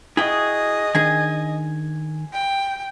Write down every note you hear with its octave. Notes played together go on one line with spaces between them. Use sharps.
E4 F#4 G#4 D#5 G5
D#3 D4 G#4 G#5
G5